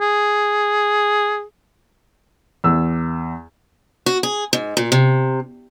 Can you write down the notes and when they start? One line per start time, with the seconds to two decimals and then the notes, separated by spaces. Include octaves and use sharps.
0.01 G#4
2.64 E2 E6
4.06 F#4
4.23 G#4
4.53 G#2
4.77 A#2
4.92 C3